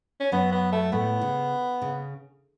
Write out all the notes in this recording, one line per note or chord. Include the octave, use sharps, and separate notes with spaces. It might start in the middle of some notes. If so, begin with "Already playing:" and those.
C#4
F#2 F#3 B3
B3
A3
A2 A3 B3
C#3
C#3